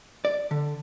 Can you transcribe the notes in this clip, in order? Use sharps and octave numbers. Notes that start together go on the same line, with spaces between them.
D5
D3